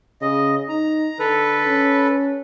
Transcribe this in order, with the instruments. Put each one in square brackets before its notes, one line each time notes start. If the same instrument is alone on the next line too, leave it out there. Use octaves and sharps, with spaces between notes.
[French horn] C#3 [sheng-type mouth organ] D#5
[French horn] D#4 [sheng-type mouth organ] A#5
[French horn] D3 [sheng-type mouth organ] A4 B4
[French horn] C#4